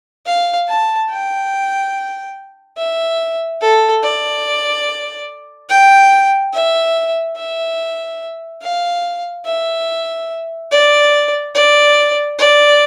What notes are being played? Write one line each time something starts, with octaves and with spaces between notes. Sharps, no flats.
F5
A5
G5
E5
A4
D5
G5
E5
E5
F5
E5
D5
D5
D5